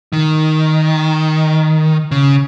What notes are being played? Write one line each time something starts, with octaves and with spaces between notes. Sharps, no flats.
D#3
C#3